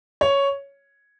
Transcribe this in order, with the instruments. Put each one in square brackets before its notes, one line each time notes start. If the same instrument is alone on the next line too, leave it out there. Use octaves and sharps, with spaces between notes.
[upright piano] C#5